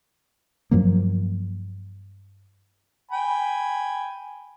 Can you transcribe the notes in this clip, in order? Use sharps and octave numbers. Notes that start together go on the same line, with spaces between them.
G2 F3 F#3 A#3
G5 G#5 B5